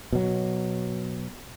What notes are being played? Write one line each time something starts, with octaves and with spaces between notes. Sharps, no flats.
B2 F#3